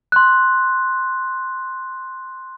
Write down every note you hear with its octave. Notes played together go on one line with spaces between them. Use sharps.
C6 F#6